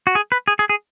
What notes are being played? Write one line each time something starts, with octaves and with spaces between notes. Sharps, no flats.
F#4
G#4
B4
G#4
G#4
G#4